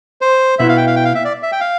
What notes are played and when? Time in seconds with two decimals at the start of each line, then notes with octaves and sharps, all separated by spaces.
0.21 C5
0.59 B2 B3 E4 E5
0.69 F5
0.77 G5
0.87 F5
0.96 G5
1.05 F5
1.15 E5
1.25 D5
1.43 E5
1.52 G5
1.60 F5